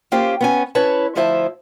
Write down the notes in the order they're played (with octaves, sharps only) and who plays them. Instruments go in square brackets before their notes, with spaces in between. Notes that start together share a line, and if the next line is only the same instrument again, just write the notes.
[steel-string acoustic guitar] A#3 C#4 F4 G4 C5
B3 C#4 G#5
C#4 E4 B4 C#5 A5
D2 F3 E4 C5 E5 A5